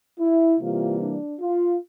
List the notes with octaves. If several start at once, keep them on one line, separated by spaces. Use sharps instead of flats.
E4
C3 E3 G3 A#3 F4
D4
F4